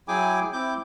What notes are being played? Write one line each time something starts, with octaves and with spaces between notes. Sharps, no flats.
F#3 E4 G#4 G5 G#5 D6
C4 E4 D6 G6